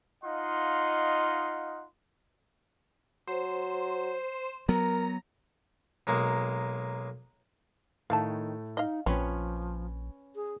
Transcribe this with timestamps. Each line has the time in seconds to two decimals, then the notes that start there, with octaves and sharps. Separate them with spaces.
0.24 D#4 F4 D#5 F5 F#5 C6
3.27 F#3 C5
4.69 F#3 B3 A#4 A#5
6.07 B1 G#3 A#3
8.10 A2 D#3 A3 F5 A5
8.77 D#4 D#5 F5
9.06 A#1 F3 C4 C#4 B4 C#5
10.36 G#4